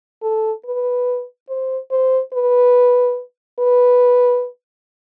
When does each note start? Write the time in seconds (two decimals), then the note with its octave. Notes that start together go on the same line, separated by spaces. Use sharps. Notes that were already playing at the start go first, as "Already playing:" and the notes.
0.23 A4
0.66 B4
1.49 C5
1.91 C5
2.33 B4
3.59 B4